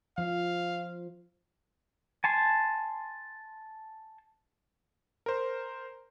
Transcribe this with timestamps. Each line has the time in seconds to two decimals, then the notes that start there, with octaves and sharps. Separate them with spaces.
0.18 F3 F5
2.24 G#5 A5 C6
5.26 A#4 C5